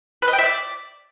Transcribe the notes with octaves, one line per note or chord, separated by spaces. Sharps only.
B4
D#5
G5
E5
D5